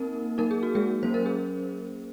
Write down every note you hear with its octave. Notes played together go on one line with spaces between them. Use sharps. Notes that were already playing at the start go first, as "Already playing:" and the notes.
Already playing: A#3 C4 D#4 A#4
F#3 A#3 D#4 A#4
G#4
F#4
G#3 G#4
F#3 A#3 C#4 C5
A#4
G#4